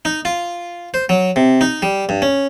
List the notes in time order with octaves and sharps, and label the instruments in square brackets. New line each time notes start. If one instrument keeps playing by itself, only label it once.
[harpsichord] D#4
F4
C5
F#3
C3
D#4
G3
G2
C#4